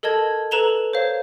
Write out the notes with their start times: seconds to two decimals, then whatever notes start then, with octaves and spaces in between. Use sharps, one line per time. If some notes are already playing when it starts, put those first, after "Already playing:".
0.03 A4 A#4 D#5 A5 G#6
0.51 A4 B4 A#5 E7 F7 G7
0.93 C5 C#5 F5